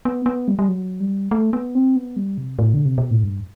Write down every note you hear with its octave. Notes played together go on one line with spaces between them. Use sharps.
B3
B3
G3
G3
F#3
G3
A3
B3
C4
B3
G3
C3
A2
D3
C3
B2
A2
G2